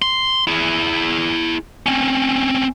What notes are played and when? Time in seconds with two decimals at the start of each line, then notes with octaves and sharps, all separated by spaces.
0.02 C6
0.47 E4 G#4
1.86 C4 C#4